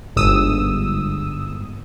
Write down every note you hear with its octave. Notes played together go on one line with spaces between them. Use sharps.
G1 G#2 D#6 E6